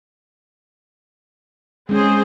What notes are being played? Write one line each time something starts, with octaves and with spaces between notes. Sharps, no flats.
G#3 C4 C#4 G#4 C5